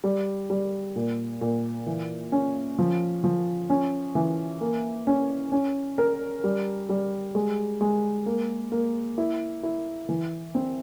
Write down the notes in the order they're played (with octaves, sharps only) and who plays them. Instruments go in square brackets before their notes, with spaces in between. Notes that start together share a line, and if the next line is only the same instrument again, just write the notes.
[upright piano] G3
G3
A#2
A#2
E3
C#4
F3
F3
C#4
E3
A#3
C#4
C#4
A#4
G3
G3
G#3
G#3
A#3
A#3
E4
E4
E3
C4